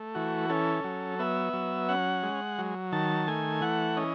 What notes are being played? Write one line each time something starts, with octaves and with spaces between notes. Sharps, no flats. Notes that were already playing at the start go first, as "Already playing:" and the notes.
Already playing: A3
E3 F#4
C#4 A4
F#3
B3 E5
F#3
C#4 F#5
G#3
F#3
D#3 A5
A3 G#5
E3 F#5
C#4 D#5